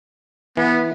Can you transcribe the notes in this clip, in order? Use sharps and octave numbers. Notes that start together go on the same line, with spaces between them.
E3 B3